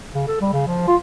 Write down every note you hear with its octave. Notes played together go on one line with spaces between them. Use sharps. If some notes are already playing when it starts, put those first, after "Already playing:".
C#3
A4
G3
C#3
F3
F4